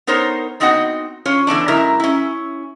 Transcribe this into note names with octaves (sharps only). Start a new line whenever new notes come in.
B3 D#4 A#4 C5 C#5
B3 C4 D#4 F#4 D#5 F#5
C#4 F4 C#5
D3 E3 B3 D4
F#2 G#3 E4 A#4 E5 A#5
C#4 E4